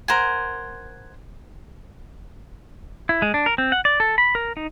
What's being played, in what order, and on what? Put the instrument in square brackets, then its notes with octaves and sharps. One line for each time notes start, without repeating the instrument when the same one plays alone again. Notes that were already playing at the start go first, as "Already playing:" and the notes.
[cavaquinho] A#4 C5 F#5 G#5
[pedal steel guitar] E4
G#3
D4
A#4
C4
F#5
D5
A4
B5
A#4
D#4